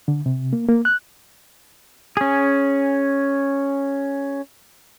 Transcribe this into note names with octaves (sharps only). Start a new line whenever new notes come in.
D3
C3
A#3
A#3
F#6
C#4 G#4